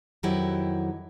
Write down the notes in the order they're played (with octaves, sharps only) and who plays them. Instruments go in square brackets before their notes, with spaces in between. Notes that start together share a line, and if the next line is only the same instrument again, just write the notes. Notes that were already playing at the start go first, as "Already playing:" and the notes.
[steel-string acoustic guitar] F2 D#3 F#3 E4 G4 F#5